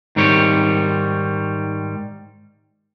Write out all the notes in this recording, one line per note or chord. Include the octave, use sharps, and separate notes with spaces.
G#2 D#3 G3 C#5